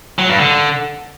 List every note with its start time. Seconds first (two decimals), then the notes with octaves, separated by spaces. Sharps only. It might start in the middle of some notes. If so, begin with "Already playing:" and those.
0.19 F#3
0.29 G2
0.39 D3